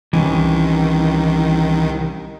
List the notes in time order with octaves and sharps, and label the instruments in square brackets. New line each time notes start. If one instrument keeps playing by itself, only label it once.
[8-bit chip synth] C2 D#3 [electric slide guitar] E3 C#4